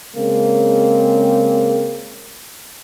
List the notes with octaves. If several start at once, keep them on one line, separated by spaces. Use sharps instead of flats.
C#3 G#3 A#3 C4